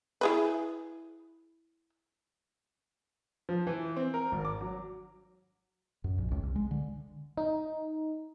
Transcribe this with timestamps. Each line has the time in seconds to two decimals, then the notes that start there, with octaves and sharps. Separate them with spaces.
0.21 E4 G#4 B4
3.49 F3
3.67 E3
3.96 C4
4.14 A#4
4.32 G#1
4.45 D6
4.61 F#3
6.04 F#2
6.18 A#1
6.31 C#2
6.43 C2
6.56 G#3
6.71 D3
7.37 D#4